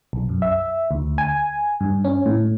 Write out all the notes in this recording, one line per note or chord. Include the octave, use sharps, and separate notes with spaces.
B1
F#2
E5
D2
G#5
G2
C#4
A2